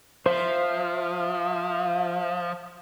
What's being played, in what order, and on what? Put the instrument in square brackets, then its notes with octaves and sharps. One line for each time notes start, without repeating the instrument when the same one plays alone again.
[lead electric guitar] F3 [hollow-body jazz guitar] C5 [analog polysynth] E5 F5